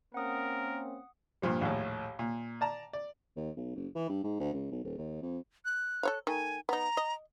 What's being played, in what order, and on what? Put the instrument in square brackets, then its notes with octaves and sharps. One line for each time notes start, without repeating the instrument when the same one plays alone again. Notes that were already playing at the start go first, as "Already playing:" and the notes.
[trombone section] A#3 C4 C#4 [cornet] A#4 [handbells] F#5 D#6
[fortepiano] G2 A#2 F3 G3
A#1 D#2 A2
A#2
D5 A5 A#5
D5
[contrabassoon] D#2
B1
F#1
E3
G2
G#2
D2
C#2
B1
D#1
D#2
F2
[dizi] F#6
[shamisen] A4 C#5 F5
[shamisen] D#3 A3 [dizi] G#5
[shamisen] B3 D#4 [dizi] A#5
[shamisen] D#5